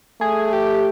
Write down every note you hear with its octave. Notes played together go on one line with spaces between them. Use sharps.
A3 G#4
G4